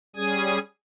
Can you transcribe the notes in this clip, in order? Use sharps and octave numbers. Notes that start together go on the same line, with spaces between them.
G3 C#4 G#4 D#6 G#6